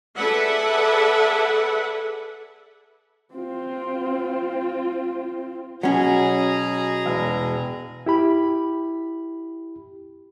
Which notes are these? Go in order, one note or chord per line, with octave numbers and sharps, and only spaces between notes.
G#4 A4 B4 D5 E5 F#5
C4 F4
B2 F#3 C#4 G#4 A#5
E1
E4 G4 B5